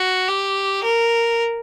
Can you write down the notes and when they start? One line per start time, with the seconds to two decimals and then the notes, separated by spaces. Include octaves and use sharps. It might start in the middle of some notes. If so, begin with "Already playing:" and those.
Already playing: F#4
0.29 G4
0.84 A#4